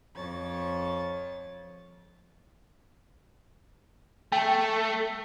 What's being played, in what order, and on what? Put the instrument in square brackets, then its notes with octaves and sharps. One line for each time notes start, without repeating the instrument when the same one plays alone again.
[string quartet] F2 C#5 A6
[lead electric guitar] A3 [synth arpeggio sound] G5